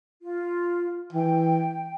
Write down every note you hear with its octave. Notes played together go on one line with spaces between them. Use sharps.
F4
E3 G5